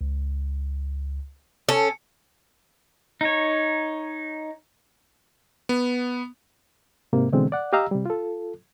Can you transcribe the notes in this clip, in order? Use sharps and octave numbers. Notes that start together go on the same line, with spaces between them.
C#2
C#4 A4
D#4 C#5
B3
G#2 C3 A#3
B2 D3 E3 G#3 C4
D5 F#5
G4 D#5 F5 A#5 E6
C3 G3
F4 A4